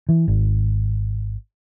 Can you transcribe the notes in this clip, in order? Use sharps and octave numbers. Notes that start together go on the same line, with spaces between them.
E3
G#1